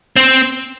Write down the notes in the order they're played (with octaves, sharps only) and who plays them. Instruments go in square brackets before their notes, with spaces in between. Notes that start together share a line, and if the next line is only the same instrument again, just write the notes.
[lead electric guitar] C4